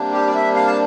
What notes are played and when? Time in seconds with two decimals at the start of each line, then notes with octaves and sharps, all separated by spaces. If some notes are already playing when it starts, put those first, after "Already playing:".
Already playing: C3 G3 A#3 D4
0.13 G4
0.27 D5
0.35 E5
0.56 F5
0.67 A5